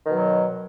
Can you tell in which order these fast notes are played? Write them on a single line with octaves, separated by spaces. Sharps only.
D#3 B2 F#3